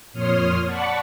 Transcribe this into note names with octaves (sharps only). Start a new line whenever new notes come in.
F2 A#2 C#5 C6 D#6 F6
D5 F#5 A5 B5 C#6